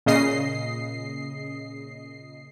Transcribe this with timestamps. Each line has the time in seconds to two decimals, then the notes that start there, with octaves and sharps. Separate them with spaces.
0.06 A#2 C#3 D#5 C7